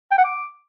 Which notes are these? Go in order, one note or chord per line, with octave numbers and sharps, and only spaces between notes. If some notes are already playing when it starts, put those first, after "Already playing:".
G5
F#5
D6